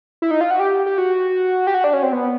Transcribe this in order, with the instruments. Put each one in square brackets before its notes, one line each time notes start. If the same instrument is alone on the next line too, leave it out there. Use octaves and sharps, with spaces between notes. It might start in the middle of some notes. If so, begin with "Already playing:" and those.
[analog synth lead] E4
D#4
F4
F#4
G4
G4
F#4
G4
F#4
D4
C#4
C4
B3